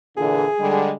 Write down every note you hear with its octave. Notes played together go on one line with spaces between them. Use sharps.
A#2 D3 E3 G#4
D3 G3 G#3